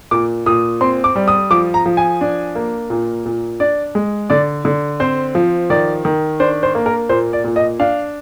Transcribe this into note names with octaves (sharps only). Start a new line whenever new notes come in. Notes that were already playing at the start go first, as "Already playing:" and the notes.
A#2 D6
A#2 D#6
C4 C6
D6
G3
D#6
F3 D6
A#5
F3
G#5
D4
A#3
A#2
A#2
D4 D5
G#3
D3 D5
D3
C4 C5
F3
D#3 D5
D#3
D4 C5
C5
A#3
A#4
A#2 C5
D5
A#2
D#5
D4 F5